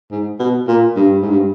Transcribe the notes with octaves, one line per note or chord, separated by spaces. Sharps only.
G#2
B2
A#2
G2
G#2
G2